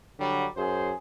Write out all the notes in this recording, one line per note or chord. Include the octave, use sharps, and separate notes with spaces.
D3 F#3 G3
F#2 G#4 C5